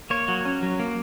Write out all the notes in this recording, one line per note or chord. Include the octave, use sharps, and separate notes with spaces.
A#3 C#5
F#3
C#4
F#3
A#3